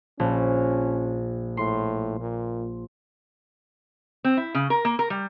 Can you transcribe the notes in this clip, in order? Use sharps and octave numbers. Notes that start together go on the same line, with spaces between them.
A#1 C#4
A2 C6
A#2
C4
E4
C#3
A#4
A#3
A#4
G3